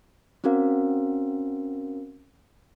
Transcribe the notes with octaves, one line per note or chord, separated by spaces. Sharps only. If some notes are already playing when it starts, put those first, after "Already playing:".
C4 C#4 F#4 A#4 F5